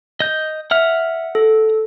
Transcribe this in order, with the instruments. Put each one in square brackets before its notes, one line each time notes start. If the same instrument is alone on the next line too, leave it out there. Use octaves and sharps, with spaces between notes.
[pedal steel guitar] D#5 G6
[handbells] E5 [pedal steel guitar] F#5 F6
[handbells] A4